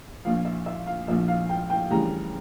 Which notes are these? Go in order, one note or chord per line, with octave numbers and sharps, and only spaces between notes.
A#1 A#2 F3 F5
E5
E5
F5
A#1 A#2 F3 E5
F5
G5
G5
D2 C#3 E3 G3 A#5